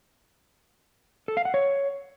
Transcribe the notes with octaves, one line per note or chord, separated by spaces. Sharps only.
A4
F5
F#5
C#5